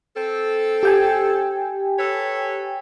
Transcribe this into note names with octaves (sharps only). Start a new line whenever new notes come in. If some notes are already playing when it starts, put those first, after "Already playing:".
C4 A4
G4 G5 G#5
A4 B4 C#5